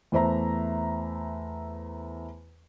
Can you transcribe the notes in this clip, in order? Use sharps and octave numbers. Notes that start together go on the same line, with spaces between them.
E2 A3 C5 E5 A#5